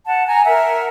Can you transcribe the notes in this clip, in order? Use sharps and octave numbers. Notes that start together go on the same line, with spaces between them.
F#5 A5
G#5 A#5
A#4 E5 F#5